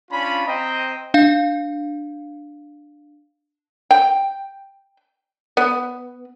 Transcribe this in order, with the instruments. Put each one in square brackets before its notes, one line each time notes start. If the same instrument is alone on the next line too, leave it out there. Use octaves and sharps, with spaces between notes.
[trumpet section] C#4 D4 F4 B5
C4 C5 D#5 G5 A#5
[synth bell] D4 F5
[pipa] G5
B3